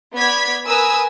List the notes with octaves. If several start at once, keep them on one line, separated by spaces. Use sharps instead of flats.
B3 D5 G#6 B6
A#4 B4 G#5 D#6 E6